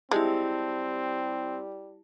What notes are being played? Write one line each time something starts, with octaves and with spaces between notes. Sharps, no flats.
G3 G#3 C4 E4 G4 A5